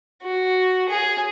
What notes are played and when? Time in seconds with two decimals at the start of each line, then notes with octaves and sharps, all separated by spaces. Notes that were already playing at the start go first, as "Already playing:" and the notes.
0.23 F#4
0.89 G#4